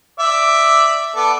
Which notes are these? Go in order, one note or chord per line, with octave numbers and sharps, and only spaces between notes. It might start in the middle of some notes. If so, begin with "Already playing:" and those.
D5 E5
B3 A4 D5